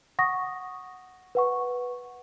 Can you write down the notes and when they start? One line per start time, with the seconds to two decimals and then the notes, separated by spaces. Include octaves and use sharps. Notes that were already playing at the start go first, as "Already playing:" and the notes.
0.19 F#5 C#6 D#6 A#6
1.35 B4 F#5 C#6